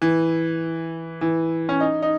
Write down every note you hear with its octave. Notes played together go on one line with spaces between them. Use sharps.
E3
E3
C#4
D#4
D#4